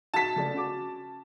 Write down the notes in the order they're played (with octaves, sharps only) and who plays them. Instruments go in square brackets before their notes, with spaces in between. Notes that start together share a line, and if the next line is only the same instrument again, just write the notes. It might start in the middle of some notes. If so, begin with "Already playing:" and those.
[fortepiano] F#4 [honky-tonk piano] A5 B6
[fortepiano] C#2 A3 D5
C#3 F#4 D6